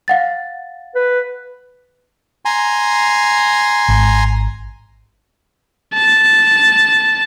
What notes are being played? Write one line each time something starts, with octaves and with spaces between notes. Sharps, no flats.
F5 F#5 A6
B4
G#5 A#5 C6
G#1
A5